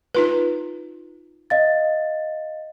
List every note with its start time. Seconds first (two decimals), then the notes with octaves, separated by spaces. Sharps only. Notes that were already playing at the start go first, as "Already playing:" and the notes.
0.14 D#4 F4 B4
1.50 D#5 F5 A6